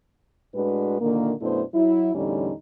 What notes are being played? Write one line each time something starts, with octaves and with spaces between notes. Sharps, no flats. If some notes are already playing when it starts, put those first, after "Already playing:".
A2 G#3 D4 F#4 B4
A#2 D3 D#3 A#3
F#2 B2 A3 D4 E4 C5
F#3 E4
E2 A2 D3 G3 C#4 D#4